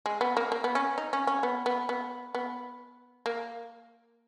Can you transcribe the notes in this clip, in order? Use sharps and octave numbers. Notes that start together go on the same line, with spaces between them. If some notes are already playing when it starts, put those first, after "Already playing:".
G#3
B3
A#3
A#3
B3
C#4
D#4
C#4
C#4
B3
B3
B3
B3
A#3